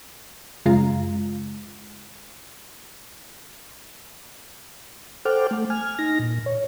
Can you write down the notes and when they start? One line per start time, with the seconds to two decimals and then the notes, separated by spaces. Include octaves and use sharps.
0.65 F#2 C#3 G#3 F4 F5 A#5
5.25 A4 C5 F#5 G5 D6 F6
5.51 A3
5.70 G#5 F6
5.99 D#4 A#6
6.19 A#2
6.46 C#5